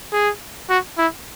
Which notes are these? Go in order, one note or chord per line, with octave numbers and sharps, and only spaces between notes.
G#4
F#4
E4